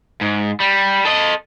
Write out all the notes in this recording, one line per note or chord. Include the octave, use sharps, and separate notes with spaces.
G#2
G3
A4 D#5